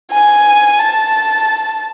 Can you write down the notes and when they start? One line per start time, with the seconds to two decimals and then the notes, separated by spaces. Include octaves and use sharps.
0.12 G#5
0.79 A5